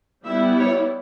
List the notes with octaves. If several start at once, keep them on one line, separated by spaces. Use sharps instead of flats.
G3 B3 E4 E5
C#5